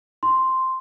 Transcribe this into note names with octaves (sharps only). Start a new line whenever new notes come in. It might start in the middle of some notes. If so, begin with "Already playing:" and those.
C6